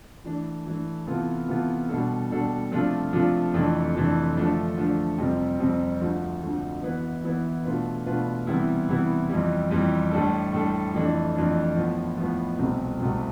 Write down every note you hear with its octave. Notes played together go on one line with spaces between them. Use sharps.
E3 A3 D4
E3 A3 D4
C3 E3 B3 F4 A4
C3 E3 B3 F4 A4
B2 G3 D4 A4
B2 G3 D4 A4
C3 F3 A3 D4 F4
C3 F3 A3 D4 F4
F2 C3 E3 A3 D4
F2 C3 E3 A3 D4
D3 F3 A3 D4
D3 F3 A3 D4
F2 C3 G3 C4
F2 C3 G3 C4
D2 D3 F3
D2 D3 F3
E3 B3 E4 B4
E3 B3 E4 B4
B2 A3 D4 F4 B4
B2 A3 D4 F4 B4
C3 E3 G3 B3 E4
C3 E3 G3 B3 E4
F2 E3 G3
F2 E3 G3
A2 G3 D4 A4
A2 G3 D4 A4
F2 E3 A3 D4
F2 E3 A3 D4
A2 F3 B3
A2 F3 B3
C2 B2 A3 C4 G4
C2 B2 A3 C4 G4